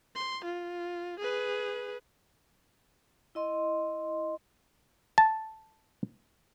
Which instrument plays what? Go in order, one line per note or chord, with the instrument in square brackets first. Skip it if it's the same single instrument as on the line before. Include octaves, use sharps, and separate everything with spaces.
[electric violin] C6
F4
G#4 B4
[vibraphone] E4 D#5 C6
[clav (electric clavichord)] A5